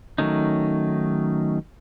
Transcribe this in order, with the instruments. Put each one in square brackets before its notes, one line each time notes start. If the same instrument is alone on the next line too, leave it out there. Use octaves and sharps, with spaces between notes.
[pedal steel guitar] D#3 F#3 A3 C#4 D#4